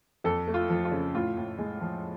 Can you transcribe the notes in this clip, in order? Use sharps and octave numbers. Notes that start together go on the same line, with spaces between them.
F2 A4
A3
F4
F3
F4
C#3
A2 F4
A2
G#3
F3